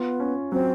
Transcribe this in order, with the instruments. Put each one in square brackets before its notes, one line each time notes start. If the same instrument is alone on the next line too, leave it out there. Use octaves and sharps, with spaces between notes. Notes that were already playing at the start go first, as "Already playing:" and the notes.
Already playing: [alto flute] B3 [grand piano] F4
[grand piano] C#4
[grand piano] F#3 [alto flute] C4